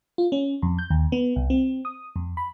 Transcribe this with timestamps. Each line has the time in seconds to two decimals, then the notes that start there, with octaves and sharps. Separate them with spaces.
0.18 F4
0.32 C#4
0.62 F2
0.79 G6
0.90 D#2
1.12 B3
1.36 C2
1.50 C4
1.85 D#6
2.16 F2
2.37 B5